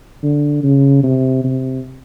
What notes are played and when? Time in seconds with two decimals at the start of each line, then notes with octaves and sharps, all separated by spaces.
0.23 D3
0.63 C#3
1.03 C3
1.44 C3